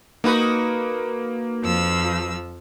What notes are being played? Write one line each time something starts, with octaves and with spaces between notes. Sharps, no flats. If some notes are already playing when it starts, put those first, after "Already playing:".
A#3 D#4 F#4 B4
F2 F3 E6